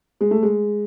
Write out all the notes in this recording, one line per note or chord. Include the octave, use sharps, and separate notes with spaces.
G#3
A3
G#3